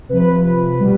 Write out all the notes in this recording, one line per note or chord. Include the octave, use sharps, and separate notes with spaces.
C3 F3 B4
B2 G3